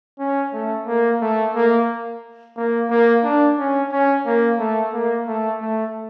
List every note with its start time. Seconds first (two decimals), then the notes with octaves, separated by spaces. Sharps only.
0.19 C#4
0.53 A3
0.87 A#3
1.21 A3
1.54 A#3
2.57 A#3
2.90 A#3
3.24 D4
3.58 C#4
3.91 C#4
4.26 A#3
4.59 A3
4.93 A#3
5.27 A3
5.61 A3